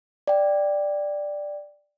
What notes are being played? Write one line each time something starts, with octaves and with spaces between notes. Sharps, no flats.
D5 G5